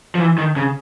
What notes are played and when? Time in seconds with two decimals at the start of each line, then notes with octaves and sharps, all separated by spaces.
0.15 F3
0.20 E3
0.38 D#3
0.56 C#3